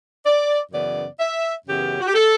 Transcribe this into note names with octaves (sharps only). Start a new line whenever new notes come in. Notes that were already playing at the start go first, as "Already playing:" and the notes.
D5
F#2 C#3 E3 B3 D5
E5
F#2 C#3 E3 B3 G4
F#4
G4
A4